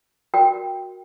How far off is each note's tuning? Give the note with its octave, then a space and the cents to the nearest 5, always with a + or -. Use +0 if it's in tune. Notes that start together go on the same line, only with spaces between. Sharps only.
F#4 -10 A#4 +0 G5 +0